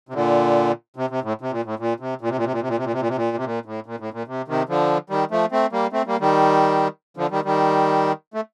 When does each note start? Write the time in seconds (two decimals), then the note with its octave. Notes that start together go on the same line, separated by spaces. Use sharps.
0.09 C3
0.14 A#2 D3
0.96 C3
1.10 C3
1.23 A2
1.41 C3
1.52 A#2
1.65 A2
1.79 A#2
2.00 C3
2.21 A#2
2.29 C3
2.37 A#2
2.44 C3
2.52 A#2
2.61 C3
2.68 A#2
2.77 C3
2.84 A#2
2.93 C3
3.00 A#2
3.09 C3
3.16 A#2
3.37 C3
3.45 A#2
3.65 A2
3.86 A#2
4.00 A2
4.13 A#2
4.27 C3
4.48 C3 D#3
4.69 D3 F3
5.10 D#3 G3
5.31 F3 A3
5.52 A3 C4
5.72 G3 A#3
5.92 A3 C4
6.06 G3 A#3
6.20 D#3 G3
7.17 D3 F3
7.31 D#3 G3
7.44 D#3 G3
8.34 A3